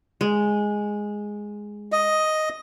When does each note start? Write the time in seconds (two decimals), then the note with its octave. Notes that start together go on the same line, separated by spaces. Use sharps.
0.21 G#3
1.92 D#5